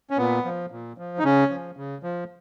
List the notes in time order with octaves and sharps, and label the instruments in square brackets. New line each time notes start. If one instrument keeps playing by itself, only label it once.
[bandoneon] C#4
A#2 B3
F3
A#2
F3
D#4
C#3 C#4
F3
C#3
F3